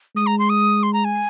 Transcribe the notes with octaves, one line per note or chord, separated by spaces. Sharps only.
G#3 D#6
A#5
C6
D#6
C6
A#5
G#5